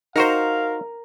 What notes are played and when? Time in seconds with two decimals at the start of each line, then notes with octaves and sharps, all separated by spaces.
0.16 D#4 F#4 A#4 C5 F5